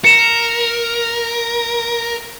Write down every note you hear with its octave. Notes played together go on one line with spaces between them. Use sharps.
A#4 C#7 E7